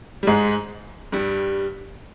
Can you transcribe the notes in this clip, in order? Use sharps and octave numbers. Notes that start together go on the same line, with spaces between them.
G3
G#2 G#3
G2 G3